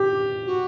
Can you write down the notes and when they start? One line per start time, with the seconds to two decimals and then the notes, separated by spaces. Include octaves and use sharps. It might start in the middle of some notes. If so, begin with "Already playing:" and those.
Already playing: G4
0.46 F#4